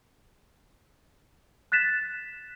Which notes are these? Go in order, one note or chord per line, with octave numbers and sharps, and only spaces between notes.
F#6 A6 B6 E7